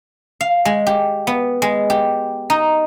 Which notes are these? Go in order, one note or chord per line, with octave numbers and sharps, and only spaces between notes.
F5
G#3
G4
B3
G#3
G4
D#4